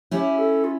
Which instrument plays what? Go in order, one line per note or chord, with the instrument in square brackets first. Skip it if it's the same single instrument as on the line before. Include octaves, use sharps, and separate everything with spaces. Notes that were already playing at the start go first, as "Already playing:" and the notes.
[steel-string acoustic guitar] C#4 E4 [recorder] G4
[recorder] A4
F4